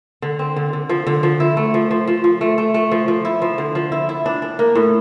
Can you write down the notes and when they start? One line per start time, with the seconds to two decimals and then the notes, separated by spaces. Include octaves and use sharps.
0.22 D3
0.39 C4
0.56 D3
0.73 D3
0.89 F3
1.07 D3
1.23 F3
1.40 E4
1.57 A3
1.74 F3
1.91 F3
2.07 F3
2.24 F3
2.41 A3
2.58 A3
2.74 A3
2.92 F3
3.08 F3
3.25 E4
3.42 F3
3.58 D3
3.75 F3
3.92 E4
4.09 E4
4.26 D4
4.42 D4
4.59 A#3
4.75 A2